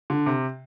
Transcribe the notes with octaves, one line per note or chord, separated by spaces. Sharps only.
D3
C3